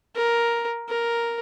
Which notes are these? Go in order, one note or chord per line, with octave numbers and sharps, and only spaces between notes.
A#4
A#4